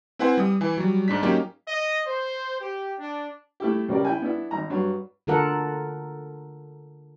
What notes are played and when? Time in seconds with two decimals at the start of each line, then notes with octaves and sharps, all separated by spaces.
0.19 C4 E4 B4 F#5 G#5 C6
0.37 G3 D#6
0.61 E3 G#5
0.77 F#3 G3
1.08 G#2 D4 B6
1.23 F#3 A#3 C#4 D#4 G4
1.68 D#5
2.07 C5
2.60 G4
3.00 D4
3.60 A3 E4 G4
3.88 C#2 G3 C#4 G4 A#4 D5
4.05 E4 G5 G#5
4.22 B3 D4 E4
4.51 G#1 A#5
4.70 G2 F#3
5.27 D3 F4 A4 A#4 F#5